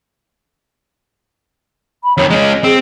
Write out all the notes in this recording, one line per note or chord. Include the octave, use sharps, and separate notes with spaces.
B5
F2 D#3 C#5
G#3 C#4 D#5
C4 G#4